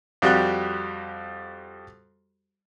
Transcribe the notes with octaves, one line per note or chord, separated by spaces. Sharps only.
F2 G3 F#4 G4 F#6